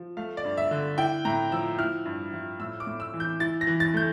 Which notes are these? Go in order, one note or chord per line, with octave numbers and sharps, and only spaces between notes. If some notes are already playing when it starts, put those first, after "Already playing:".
Already playing: F3
A3 F5
D5
G2
E5
D3
E4 G5
A2 A#5
F3 E6
E4 F6
G2
F3
A2 E6
D6
A2
E6
E3
G6
E4 A6
A#6
E3
A6
A3 G6